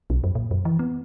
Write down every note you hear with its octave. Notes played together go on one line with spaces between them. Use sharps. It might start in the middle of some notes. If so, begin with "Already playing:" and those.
B1
F#2
A#2
F#2
E3
B3